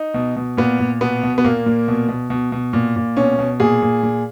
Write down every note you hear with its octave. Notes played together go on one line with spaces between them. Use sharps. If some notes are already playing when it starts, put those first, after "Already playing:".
Already playing: D#4
B2
B2
A#2 B3
A#2
B2 B3
B2
B3
A#2 A#3
A#2
B2
B2
B2
B2
A#2
A#2
B2 C#4
B2
A#2 G#4
A#2
A#2